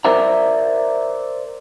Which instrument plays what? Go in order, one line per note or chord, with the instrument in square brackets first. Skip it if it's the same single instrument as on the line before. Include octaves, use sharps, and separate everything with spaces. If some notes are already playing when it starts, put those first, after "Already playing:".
[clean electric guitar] A#4 C5 D5 E5 A#5